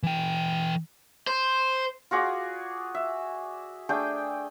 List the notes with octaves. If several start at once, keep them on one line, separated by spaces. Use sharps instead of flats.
E3 G5
C5
F4 F#4 G#4 D5
E5
A3 D4 G#4 G5